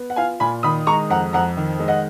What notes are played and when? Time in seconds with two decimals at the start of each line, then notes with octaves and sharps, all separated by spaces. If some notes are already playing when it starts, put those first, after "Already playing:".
Already playing: B3
0.10 F#5
0.16 F4 F5 G#5
0.40 A#2 G#5 B5
0.63 D#3 B5 D#6
0.87 G#3 A#5 C#6
1.10 F2 F#5 A#5
1.33 F2 F#5 A#5
1.57 D#3
1.80 G#3
1.88 D#5 F#5